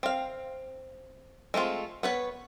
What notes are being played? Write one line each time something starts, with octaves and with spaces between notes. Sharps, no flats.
C4 F5
G#3 A3 C4 F4
B3 B4 C#5